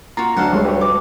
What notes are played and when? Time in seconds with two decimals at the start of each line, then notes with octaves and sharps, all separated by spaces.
0.17 A#2 F4 F#4 A#5
0.37 D2 F#3 D4 A4 F5 F#5
0.53 F3 G3 G#3 C#5
0.65 G4 B4 C#5
0.81 D6